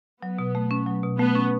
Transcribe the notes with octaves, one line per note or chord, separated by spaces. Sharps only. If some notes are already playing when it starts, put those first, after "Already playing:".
F#3 B3
B2
A3
C#4
F#3
B2
A3 B3
C#4